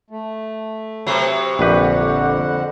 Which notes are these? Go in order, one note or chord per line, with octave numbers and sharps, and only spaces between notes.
A3
C3 F#3 B4 C5
A#1 F2 D3 G3 F#4 G4 B4 F#5